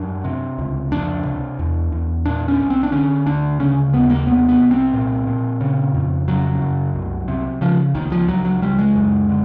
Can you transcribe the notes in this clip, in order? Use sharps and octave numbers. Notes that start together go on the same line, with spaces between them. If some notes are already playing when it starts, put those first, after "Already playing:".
Already playing: F#2 D4
C3
C#2
F2 D4
C3
E2
E2
A#2 D4
C#4
C2
C4
D4
D3 C#4
D2 D4
C#3 C#4
D#2 B3
A#3
C3 B3
B3
C2
C4
A#2
A#2
C#3
F2
C#3 F#3
F#2
C2
C3
C#3 F3
C#2 D#3
F3
C#2 F#3
F#3
C#2 G3
G#3
F#2
D3